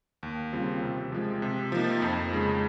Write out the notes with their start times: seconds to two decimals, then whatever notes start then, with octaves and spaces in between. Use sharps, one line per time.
0.23 D#2
0.53 C#3 G3 C4 F4
0.83 C3
1.12 F3 G#3
1.42 C3
1.72 F3 A#3 D#4
2.02 F2
2.31 C#3 G#3 D#4